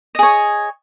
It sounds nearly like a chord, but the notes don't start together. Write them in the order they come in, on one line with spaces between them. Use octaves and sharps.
D#5 G#4 C#5